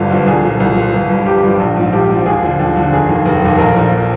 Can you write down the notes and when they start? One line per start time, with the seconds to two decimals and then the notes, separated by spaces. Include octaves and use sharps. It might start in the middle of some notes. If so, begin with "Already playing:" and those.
Already playing: G1 G2 D3 F3 F4
0.10 G2 D3 F3
0.26 C2 G#4
0.43 A#2 F3
0.60 C2
0.77 A#2 F3
0.93 G1
1.10 G2 F3
1.26 G1 G4
1.43 G2 F3
1.59 A#1
1.76 G#2 F3
1.92 A#1 G4
2.09 G#2 F3
2.26 D#2 G#4
2.43 D3 F3
2.59 D#2
2.76 D3 F3
2.92 F1 G#4
3.09 D#2 D#3
3.26 F1
3.42 D#2 D#3
3.58 A#1 A#4
3.75 A#2 F3